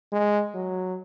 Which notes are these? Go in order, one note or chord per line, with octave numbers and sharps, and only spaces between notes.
G#3
F#3